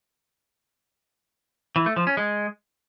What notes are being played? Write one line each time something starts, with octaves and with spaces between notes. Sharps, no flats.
E3
A3
F3
C#4
G#3